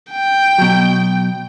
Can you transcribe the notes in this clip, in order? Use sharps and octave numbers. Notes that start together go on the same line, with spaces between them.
G5
B2 F#3